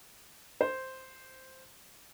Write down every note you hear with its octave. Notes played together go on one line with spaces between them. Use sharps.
C5